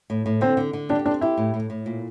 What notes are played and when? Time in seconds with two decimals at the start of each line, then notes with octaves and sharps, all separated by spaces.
0.10 A2
0.26 A2
0.41 D3 C4
0.57 D3
0.73 D3
0.89 D4 G4
1.06 C4 D4
1.21 E4 G4
1.37 A2
1.54 A2
1.70 A2
1.86 A#2